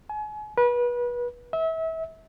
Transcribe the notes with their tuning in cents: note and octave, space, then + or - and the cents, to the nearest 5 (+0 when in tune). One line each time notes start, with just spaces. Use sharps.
G#5 +35
B4 -30
E5 -30